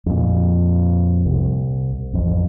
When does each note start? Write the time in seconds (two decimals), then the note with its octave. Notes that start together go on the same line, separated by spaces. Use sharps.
0.06 F2 A#2
1.25 C2
2.13 A1 F2